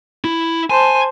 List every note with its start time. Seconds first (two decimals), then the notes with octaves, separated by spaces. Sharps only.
0.24 E4
0.70 C5 G#5 A5